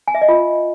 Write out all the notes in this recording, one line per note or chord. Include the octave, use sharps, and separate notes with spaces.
G#5
E5
D#5
F4